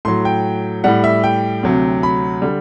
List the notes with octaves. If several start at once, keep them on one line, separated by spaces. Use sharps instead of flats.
A2 F#3 C6
G5
A2 G3 F#5
E5
G5
D2 C3 F#3
B5
D3 G3